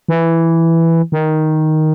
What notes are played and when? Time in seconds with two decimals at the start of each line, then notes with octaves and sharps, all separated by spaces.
0.08 E3
1.12 D#3